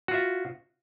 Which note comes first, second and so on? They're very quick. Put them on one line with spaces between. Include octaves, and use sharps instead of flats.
F#4 F4 E5